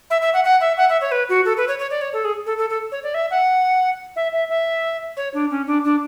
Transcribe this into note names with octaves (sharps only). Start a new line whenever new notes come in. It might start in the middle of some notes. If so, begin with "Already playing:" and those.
E5
E5
F#5
F#5
E5
F#5
E5
C#5
B4
F#4
A4
B4
C#5
C#5
D5
C#5
A4
G#4
A4
A4
A4
C#5
D5
E5
F#5
E5
E5
E5
C#5
D4
C#4
D4
D4